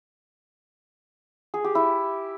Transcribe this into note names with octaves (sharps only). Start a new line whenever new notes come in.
G#4
G4
E4